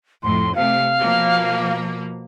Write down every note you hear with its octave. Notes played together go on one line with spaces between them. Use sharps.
F2 A2 C6
C3 A3 F5
B2 F3 A#3